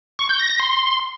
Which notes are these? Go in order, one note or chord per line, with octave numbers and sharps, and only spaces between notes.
C#6
G6
A#6
A#6
C6